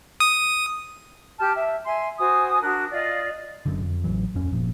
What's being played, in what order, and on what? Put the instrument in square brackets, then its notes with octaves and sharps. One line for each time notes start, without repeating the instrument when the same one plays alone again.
[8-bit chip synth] D#6
[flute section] G4 A5 F6 G6
E5
E5 G#5 C6
F#4 C5 G#5 D#6
D4 F#4 A#4 F#6
F4 D5 D#5 F5
[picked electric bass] F#1 F#2 D3
F2
A1 G#2 E3 F#3
D1 F2 C#4
G1 A#2 F3